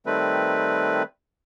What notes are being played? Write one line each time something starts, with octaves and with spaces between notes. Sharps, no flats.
D#3 G3 A3 C4 B4